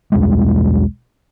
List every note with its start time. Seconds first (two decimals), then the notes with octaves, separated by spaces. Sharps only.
0.12 B1 E2 G3 G#3